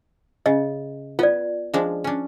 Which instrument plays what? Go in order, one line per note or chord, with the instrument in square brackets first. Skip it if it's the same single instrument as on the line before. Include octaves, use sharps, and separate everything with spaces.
[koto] C#3 [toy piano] D#5
[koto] B3 [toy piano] F4 D5
[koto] F3 G#3 D4
C#4 D4